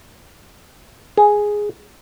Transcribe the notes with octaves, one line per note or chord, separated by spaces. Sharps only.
G#4